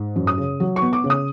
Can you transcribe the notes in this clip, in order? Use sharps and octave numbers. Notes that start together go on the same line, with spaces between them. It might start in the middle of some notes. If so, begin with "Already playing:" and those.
Already playing: G#2
F#2
D#6
C#3
F#3
C#6
B3
D6
C#3
D#6